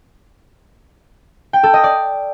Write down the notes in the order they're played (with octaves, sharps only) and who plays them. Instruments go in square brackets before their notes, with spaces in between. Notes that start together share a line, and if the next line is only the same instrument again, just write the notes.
[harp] G5
A4
D#5
D5